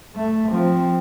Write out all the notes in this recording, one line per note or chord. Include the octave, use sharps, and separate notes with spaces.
A3
F3 C4